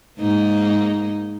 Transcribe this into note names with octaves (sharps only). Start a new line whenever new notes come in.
G#2 A#3 D#4